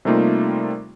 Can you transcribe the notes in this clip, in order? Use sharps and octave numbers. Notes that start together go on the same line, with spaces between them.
C3 G3 A3 A#3 D#4 F4